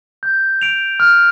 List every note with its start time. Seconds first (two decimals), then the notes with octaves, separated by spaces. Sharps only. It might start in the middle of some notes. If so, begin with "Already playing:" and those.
0.23 G6
0.62 D7 F7
1.00 F6